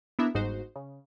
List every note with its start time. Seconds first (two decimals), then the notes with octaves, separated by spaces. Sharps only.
0.19 B3 D4 E4 A#4 E5
0.34 G1 G#2 D#4 F#4 C5
0.76 C#3